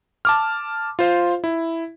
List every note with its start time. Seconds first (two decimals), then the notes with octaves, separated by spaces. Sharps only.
0.25 A5 D6 F6
0.99 F4 C5 F5
1.44 E4